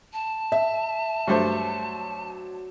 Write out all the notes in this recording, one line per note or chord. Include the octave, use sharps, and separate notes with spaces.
A5
E5
G2 F#3 A3 C5